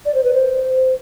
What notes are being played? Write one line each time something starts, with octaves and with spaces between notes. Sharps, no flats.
D5
C5
B4
C5